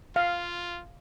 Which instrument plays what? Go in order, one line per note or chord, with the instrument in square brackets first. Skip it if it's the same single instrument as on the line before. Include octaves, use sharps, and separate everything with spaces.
[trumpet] F4 [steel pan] F5